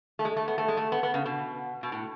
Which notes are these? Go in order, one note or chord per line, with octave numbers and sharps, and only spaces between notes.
A3
G#3
A3
B3
A3
G#3
A3
B3
B3
C#3
B2
B2
A2